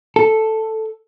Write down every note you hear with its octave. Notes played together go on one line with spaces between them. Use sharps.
A4